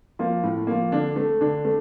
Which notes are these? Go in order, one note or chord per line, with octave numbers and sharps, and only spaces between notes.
F3 A#3
A2
F3 A#3
D3 D4
A3
D3 D4
A3